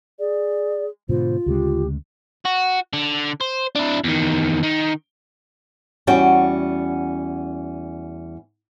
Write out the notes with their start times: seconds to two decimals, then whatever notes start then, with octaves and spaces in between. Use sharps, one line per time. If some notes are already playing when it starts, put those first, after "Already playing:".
0.19 G#4 D5
1.09 G#2 B2 D3 F4 C5
1.46 D2 C#3 G#3 G4
2.45 F#4
2.93 D3
3.41 C5
3.75 D4 E4
4.04 E2 D#3
4.63 D#3
6.07 E2 G3 C#4 F#4 G5 G#5